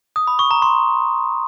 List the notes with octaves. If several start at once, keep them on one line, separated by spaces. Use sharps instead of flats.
D#6
B5
C#6
A#5
C6